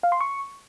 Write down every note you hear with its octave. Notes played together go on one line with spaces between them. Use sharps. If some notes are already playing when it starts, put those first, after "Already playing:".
F5
C6
C#6